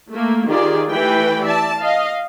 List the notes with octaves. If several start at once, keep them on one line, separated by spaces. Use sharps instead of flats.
A3 A#3
D#3 F4 G4 G#4 D5
E3 A3 G4 B4 G5 B5
D5 E5 A5
D#5 F5